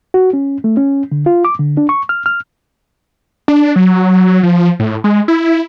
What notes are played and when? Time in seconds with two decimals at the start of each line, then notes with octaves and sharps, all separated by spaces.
0.14 F#4
0.33 C#4
0.64 A3
0.77 C#4
1.12 D3
1.26 F4
1.45 D6
1.59 D3
1.77 D4
1.89 C#6
2.09 F6
2.26 F6
3.48 D4
3.76 F#3
4.43 F3
4.80 A2
5.04 G#3
5.28 E4